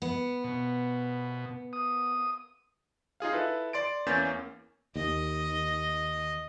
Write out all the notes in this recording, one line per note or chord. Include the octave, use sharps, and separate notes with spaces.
B3
B2
D#6
D#4 F4 G#4 F5
E4 A4 B4
D5 C6 A6 D7
E2 E3 A#3 C#4 G6 A6
D#2 D#5